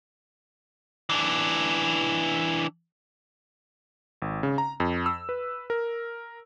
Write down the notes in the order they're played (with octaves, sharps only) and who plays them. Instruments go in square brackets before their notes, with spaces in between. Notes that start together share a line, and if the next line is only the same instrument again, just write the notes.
[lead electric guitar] E3 D4
[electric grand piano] G#1
C#3
A#5
F2
E6
B4
A#4